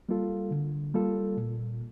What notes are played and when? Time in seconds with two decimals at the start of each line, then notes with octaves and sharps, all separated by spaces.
0.09 G3 A#3 F4 A4
0.51 D3
0.94 G3 A#3 F4 A4
1.37 A#2